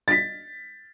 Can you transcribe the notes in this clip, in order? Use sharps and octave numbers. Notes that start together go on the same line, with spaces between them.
A6 B6